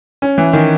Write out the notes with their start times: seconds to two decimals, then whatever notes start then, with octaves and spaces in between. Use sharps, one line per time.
0.22 C#4
0.38 E3
0.53 D#3